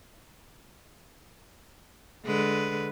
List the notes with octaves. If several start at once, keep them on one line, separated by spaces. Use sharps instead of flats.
D3 G#3 B4